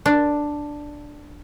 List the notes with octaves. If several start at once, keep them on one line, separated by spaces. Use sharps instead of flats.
D4